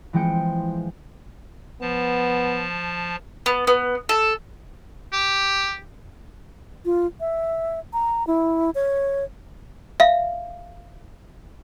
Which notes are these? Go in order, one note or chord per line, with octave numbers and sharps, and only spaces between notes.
E3 F3 G#3 C4 G5 C#7
F3 B3 A5
B3
B3
A4
G4
F4
E5
A#5
E4
C#5
E5 F5